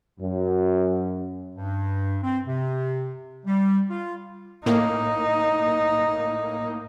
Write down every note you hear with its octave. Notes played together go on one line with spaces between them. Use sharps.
F#2
G2
C4
C3
G3
F4
A2 A#3 D#4